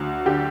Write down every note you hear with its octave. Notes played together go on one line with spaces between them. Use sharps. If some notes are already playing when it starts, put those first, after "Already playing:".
Already playing: D2 F#3
D3 G4